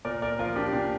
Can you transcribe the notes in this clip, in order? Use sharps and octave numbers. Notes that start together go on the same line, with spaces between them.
A#2 A#4 D5
A#4 D5
F3 F4 A#4
D4 G4
A#2 D4